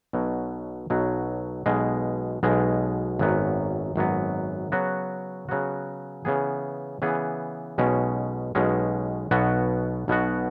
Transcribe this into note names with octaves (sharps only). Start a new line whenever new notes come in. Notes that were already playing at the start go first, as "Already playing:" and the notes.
B1 B2 F#3
B1 B2 F#3
B1 B2 G#3
B1 B2 G#3
G#1 F#2 F#3 B3
G#1 F#2 F#3 B3
C#3 F#3 B3 F#4
C#3 F#3 B3 F#4
C#3 E3 B3 G#4
C#3 E3 B3 G#4
B1 B2 G#3 C#4
B1 B2 G#3 C#4
B1 B2 B3 F#4
B1 B2 B3 F#4